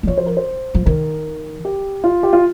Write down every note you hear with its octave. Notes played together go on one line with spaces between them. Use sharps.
G3
F3 C#5
C5
A#4
C5
F3
D#3 A#4
G4
F4
G4
F4